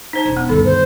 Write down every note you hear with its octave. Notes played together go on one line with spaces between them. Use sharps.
D#4 C5 A5
E1
B3
D2 G2 D#3 A4
C5